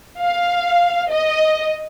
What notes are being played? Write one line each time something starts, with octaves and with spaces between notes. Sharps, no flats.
F5
D#5